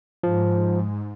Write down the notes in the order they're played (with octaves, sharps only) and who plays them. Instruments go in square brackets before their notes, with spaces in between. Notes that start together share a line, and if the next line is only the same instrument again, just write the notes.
[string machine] G#2 [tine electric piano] F3